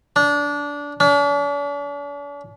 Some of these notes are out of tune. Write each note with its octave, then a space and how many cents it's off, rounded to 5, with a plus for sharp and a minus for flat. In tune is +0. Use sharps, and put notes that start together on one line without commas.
D4 -20
D4 -45